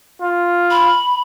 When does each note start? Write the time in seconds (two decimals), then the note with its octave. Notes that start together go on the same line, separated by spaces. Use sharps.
0.21 F4
0.71 B5